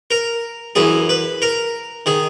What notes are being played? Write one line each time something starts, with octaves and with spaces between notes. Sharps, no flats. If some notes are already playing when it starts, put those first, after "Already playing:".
A#4
F#2 E3 G#4
B4
A#4
D#3 G#4